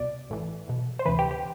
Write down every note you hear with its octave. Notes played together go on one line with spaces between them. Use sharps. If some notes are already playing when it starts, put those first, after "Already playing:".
Already playing: C2 B2 D5
A1 A2 E3
B1 B2
C5
D2 C3 E3 B4
G4
G4